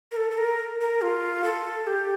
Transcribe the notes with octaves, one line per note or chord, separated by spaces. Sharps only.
A#4
A4
A4
A#4
A#4
F4
A4
G4